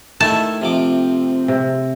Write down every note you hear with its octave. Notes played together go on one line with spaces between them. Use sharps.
D#3 A3 E4 E5 A5
C3 F3 C4 D6
C3